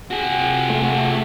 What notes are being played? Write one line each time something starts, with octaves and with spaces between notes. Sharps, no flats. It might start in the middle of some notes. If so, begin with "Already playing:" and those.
C3 F4 F#4 G#4 F#5
A3